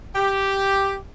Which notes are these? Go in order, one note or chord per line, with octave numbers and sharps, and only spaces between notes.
G4